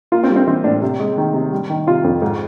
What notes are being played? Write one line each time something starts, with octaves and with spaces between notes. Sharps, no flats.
A#3 F4
C4
G3
C4
E3 C4
A2 D4
C3
G#3
D#3
C3
G3
D#3
C3 F4
F2
G#2